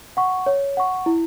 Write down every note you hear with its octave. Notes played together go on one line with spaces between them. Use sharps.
F#5 C#6
C#5
F#5 C#6
E4